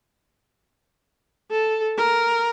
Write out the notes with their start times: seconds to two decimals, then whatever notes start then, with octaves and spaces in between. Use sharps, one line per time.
1.51 A4
1.97 A#4